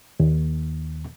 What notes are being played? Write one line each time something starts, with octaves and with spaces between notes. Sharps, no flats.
D#2